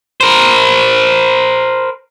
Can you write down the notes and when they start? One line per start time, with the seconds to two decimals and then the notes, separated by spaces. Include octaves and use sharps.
0.21 A#4 C5